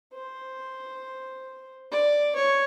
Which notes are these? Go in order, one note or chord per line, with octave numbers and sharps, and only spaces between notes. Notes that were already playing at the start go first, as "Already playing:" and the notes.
C5
D5
C#5